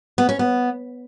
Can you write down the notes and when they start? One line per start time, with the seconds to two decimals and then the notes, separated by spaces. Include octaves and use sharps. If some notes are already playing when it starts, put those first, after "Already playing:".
0.18 B3
0.29 C#4
0.39 B3